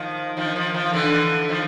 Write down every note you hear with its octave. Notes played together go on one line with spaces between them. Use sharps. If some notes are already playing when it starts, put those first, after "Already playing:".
Already playing: D#3 F3
D#3 F3
D#3 F3
D#3 F3
D3 E3
D#3 F3